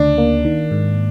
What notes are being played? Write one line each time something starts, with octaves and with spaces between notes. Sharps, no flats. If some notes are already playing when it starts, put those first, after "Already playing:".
Already playing: D2 C#3 D4
A#3
D#3
G#2